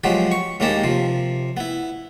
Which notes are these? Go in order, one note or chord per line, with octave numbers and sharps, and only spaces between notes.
F3 F#3 G#3 B3 G4
C#6
D#2 G#3 A#3 D#4 G4 A5
C3 F3
B3 E4